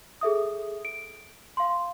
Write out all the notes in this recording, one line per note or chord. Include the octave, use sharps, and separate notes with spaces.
G#4 A4 E5 D#6
D7
F5 C6